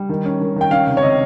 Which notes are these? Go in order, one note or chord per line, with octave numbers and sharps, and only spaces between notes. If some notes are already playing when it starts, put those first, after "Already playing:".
Already playing: G3
D#3
C#4
D#3
D#3 G5
C#4 F5
C3
C#5
C3 D#5